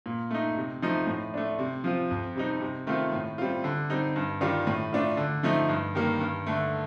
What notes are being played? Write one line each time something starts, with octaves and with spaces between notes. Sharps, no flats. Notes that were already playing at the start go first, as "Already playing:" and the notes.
A#2
A3 D#4
C3
F3 A3 D#4
A2
A3 D4
C3
F3 C4 F4
F2
C3 G3 C4 D#4
C3
D#3 A3 C4 F4
A2
G3 C4 F4
D3
G3 C4 D#4
G2
D#3 G3 D4 F4
A2
A3 D4 F4
D3
F3 A3 D#4
G2
D#3 G3 A#3
G2
D3 A3